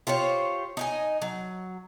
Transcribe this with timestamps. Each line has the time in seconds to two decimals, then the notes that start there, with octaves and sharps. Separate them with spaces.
0.07 F4 G4 C5 C#5
0.77 D#4 D#5 G#5
1.22 F#3